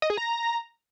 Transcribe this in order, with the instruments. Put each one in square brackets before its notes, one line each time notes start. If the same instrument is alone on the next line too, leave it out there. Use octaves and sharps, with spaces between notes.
[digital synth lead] D#5
G#4
A#5